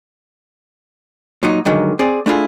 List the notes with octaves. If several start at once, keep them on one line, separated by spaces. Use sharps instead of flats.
A#2 F#3 D#4
G2 D3 D#3 F#3 G#3
C4 G#4 D5
A3 D4 E4 F4 G#4